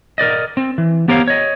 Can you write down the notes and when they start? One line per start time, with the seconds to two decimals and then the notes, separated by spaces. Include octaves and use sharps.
0.18 A#4 B4 D5 D#5
0.57 C4
0.78 E3
1.08 B3 G4 A#4 C5 C#5 F5
1.28 C#5 D#5